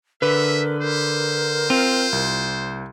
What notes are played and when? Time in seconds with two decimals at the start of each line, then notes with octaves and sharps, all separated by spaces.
0.22 D3 A#4 B4 E5
0.82 A#4 C5
1.70 C4 F4
2.12 C2